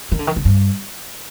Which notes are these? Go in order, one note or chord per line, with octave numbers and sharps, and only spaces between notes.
D#3
D3
D#3
D3
G2